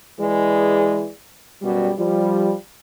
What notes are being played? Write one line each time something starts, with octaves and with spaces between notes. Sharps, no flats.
E3 G#3 G#4 B4 D5
F#2 B2 G3
F3 G3